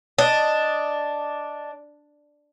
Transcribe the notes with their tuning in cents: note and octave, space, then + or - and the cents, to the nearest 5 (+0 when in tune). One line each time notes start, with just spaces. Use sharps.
D4 +0 D#5 +0